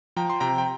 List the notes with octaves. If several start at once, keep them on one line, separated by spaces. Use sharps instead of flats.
F3 G5 A#5
C6
C3 G5 A#5
G5